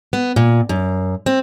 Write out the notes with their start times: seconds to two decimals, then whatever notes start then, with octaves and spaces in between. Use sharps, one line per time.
0.13 B3
0.36 A#2
0.69 F#2
1.26 C4